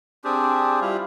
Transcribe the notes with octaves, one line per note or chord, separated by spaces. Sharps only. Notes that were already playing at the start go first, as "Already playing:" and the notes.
C4 D4 G4 G#4
G3 E4 F4